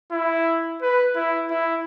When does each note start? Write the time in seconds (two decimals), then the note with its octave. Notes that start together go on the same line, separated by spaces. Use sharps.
0.12 E4
0.82 B4
1.16 E4
1.51 E4